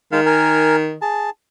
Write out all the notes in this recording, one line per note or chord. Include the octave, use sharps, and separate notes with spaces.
D#3 G#3 F5
A#4 G#5
G#4 A5